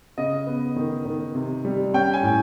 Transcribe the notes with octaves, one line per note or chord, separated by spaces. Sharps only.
C#3 D#5
B3
D#3
D#3
C3
G3
C#4 G5
G#5
A2